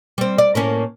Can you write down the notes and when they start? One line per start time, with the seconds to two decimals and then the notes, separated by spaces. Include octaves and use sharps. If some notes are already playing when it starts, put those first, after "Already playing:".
0.18 G3 C4
0.38 D5
0.55 A2 A#3 C#4